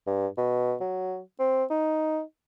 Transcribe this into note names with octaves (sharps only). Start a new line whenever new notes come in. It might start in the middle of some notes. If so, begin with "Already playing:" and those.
G2
B2
F#3
C4
D#4